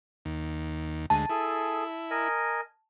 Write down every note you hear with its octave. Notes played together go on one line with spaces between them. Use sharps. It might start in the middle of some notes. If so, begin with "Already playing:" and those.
D#2
D2 G#3 A5
E4 G#4 A4
A#4 D#5 G#5